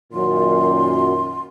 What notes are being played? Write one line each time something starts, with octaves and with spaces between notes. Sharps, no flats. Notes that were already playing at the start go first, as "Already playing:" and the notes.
F#2 A#2 D#3 C6